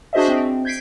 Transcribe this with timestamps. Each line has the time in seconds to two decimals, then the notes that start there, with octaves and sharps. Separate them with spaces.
0.13 D4 F#4 G#4 C5 D#5 E5
0.28 C4
0.65 G6 G#6 B6 C7 D7